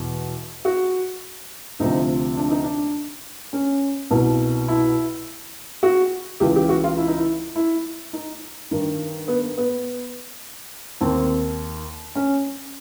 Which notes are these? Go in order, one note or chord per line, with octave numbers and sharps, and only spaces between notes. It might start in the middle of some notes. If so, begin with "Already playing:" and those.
Already playing: E2 B2
F#4
D2 C3 F3 D#4
D4
D#4
D4
C#4
C2 B2
E4
F#4
C#2 C#3 E3 G4
G4
F#4
F4
E4
D#4
E4
E4
D#4
G2 D#3
B3
B3
D#2 D#3 C4
C#4